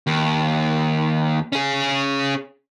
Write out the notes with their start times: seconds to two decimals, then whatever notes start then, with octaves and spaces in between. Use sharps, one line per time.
0.07 D#2
1.52 C#4 G#4